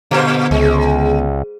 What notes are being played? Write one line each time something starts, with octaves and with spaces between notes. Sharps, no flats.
A#2 D3 B3 C5
C#2 G#3